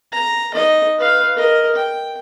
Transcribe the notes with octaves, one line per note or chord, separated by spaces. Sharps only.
A#5
D#4 D#5
B4 F5
A#4 D#5
G5